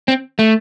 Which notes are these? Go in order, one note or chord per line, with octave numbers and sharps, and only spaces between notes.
C4
A3